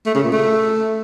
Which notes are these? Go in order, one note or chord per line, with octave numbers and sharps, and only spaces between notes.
A3
C#3
A#2
A3